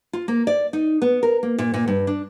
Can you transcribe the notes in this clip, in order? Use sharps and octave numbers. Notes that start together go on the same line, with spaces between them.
F4
A#3
D5
D#4
B3
A#4
A#3
A#2
A#2
G2
D4